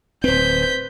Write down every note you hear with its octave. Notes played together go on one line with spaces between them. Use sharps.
D1 C4 B4 C5 G6 B6